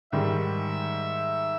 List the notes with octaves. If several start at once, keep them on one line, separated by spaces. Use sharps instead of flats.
G#2 D#3 G3 E5